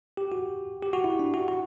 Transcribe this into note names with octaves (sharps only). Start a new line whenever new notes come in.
G4
F#4
G4
F#4
E4
D4
F#4
F#4